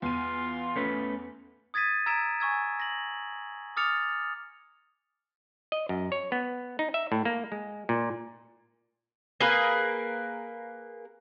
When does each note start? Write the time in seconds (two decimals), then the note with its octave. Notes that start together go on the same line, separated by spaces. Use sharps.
0.02 E2 F4 D#7
0.76 A3 C#4 B4
1.74 D#6 G#6 A6 B6 D#7
2.06 A#5 E6 G#6 B6 D7 E7
2.40 G#5 C#6 E6 G#6
2.80 A#6 F#7
3.76 D6 D#6 F6 A6 C#7 F7
5.72 D#5
5.89 F#2
6.12 C#5
6.32 B3
6.79 D#4
6.94 E5
7.12 A2
7.25 A#3
7.52 G#3
7.89 A#2
9.40 A#3 G#4 A#4 B4